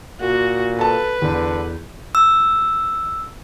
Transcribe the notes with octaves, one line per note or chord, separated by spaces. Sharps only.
A#2 F#4
A4 B4 A5
E2 D3
E6